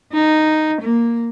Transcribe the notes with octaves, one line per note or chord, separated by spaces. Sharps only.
D#4
A#3